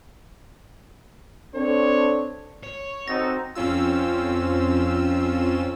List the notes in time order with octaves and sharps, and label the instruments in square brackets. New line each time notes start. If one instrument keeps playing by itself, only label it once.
[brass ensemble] C4 D4 A4 C#5
[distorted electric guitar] C#5
[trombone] C4 [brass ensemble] D#4 F#4 A4 [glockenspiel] A#6
[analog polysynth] F2 C4 C#4 F4 E6